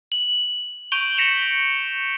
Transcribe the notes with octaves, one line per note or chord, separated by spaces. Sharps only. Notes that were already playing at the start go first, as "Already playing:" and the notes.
F#7
C#6 G6 D7 D#7 F7 G7
A#6 B6 C#7 E7 F7 G7